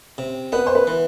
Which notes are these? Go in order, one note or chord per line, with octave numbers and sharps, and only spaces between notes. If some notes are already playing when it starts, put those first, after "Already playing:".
C3
B3 B4
C5
B4
E3